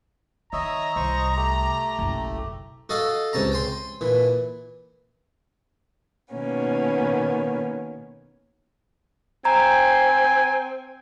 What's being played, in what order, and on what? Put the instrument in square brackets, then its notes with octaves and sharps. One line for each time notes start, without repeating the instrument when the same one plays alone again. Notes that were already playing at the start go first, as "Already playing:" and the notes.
[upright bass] D#3 [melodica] C#5 D#5 E5 [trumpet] A#5
[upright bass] C2 [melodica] C5 D#5 C#6
[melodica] A3 G4
[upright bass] F#1 B1
[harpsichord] F#4 A4 D#5 F5 G#5
C#2 C3 C#4 A5 A#5
G5 G#5 C6
A#2 E3
[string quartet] B2 D#3 A#3 B3 C#4
[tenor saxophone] C4 [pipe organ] G#5 [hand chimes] A#5